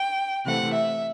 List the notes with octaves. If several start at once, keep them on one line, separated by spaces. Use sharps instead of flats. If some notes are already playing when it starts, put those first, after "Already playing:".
Already playing: G5
C3 E3 A3 C4 F#5
E5